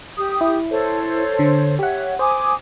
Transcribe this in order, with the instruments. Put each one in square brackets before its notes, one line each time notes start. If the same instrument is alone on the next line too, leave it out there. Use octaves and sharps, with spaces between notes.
[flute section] G4 D#6
[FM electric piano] E4
[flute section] A4 C5 C#5
[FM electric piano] D3
[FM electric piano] G4 F#5 [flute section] C#5 E5
[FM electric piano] C5 [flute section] G#5 D6 D#6